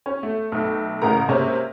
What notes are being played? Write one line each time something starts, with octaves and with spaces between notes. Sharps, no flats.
C#4
A3
B1 A3
A1 A2 C#3 A#4 A#5
C3 G#3 A#3 C#4 A#4